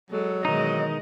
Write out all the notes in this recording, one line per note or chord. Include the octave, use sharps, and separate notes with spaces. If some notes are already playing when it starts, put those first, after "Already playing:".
F#3 G#3 A4
B2 D#3 E3 G#3 D#4 D#5